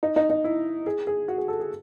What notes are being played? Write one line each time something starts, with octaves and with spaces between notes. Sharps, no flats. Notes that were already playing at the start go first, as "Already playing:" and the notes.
D#4
D#4
D#4
E4
G#4
G#4
F#4
G#4
A4
G#4